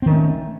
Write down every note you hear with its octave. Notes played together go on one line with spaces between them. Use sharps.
D#3 A3 C4 C#4